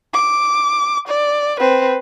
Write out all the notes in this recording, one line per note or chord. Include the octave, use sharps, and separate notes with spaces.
D6
D5
C4 B4